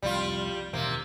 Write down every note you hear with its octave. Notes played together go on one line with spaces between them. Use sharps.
F1 C2 G3 F4
E1 C3 D#3 A#3